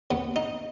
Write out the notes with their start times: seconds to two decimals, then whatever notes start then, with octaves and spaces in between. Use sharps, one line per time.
0.11 D#2 B3
0.36 D#4